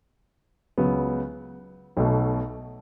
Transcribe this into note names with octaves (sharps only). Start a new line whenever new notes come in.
C#2 C#3 F#3 B3
B1 B2 A3